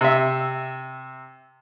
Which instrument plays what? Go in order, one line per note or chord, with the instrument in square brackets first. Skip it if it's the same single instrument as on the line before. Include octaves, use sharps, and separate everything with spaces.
[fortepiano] C3 E5